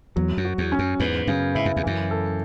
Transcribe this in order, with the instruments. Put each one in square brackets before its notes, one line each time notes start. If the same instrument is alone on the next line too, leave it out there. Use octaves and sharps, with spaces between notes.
[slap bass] E2 [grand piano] F#3
[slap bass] F#2
[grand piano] F#4
[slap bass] E2
[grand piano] C#4
[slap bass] F#2
[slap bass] E2 G#2 [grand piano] B3
[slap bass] F#2 [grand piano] C#3
[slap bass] G#2 [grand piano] E4
[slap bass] F#2
E2
[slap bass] F#2 [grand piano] E3
[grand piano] A4